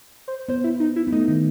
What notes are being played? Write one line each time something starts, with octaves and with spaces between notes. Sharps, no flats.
C5
B3 C5
E4
D#4
E4
B3
A3 D#4
D#3